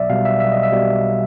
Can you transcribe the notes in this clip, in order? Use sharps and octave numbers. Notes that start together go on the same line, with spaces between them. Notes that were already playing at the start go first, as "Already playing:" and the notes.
Already playing: B1 D5 E5
B2 G3 F5
E5
B1 E5
D#5
E5
B2 G3